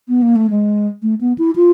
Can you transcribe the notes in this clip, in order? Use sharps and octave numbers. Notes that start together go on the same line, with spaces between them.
B3
A#3
A3
G#3
A3
B3
E4
F4